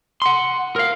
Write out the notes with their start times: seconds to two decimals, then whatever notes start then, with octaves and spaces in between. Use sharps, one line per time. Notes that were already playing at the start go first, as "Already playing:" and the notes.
0.22 F#5 C6
0.76 A#4 F5